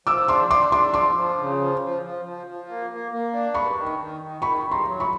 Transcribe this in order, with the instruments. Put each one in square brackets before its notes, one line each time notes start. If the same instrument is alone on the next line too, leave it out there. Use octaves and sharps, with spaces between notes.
[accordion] F3 [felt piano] D6 E6
[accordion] D4 [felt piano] C6 D6
[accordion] D4 [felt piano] C6 D6
[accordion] D4 [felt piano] C6 D6
[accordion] F3 [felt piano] C6 D6
[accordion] F3
C#3
F3
F3
F3
F3
F3
A#3
A#3
A#3
D4
[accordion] G2 [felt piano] B5 C#6
[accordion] D#3
D#3
D#3
[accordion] D#3 [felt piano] B5 C#6
[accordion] G2
[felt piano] A#5 C6
[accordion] F#3
[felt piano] B5 C#6